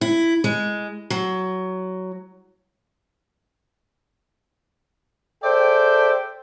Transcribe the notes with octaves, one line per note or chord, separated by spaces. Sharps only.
E4
G#3
F#3
G#4 A4 C5 D5 E5 G5